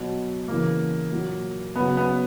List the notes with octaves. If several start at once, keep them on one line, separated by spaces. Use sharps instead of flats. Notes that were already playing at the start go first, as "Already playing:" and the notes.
Already playing: B2 F#3
C#3 E3 A#3
A#2 F#3
C#3 F#3 B3
B3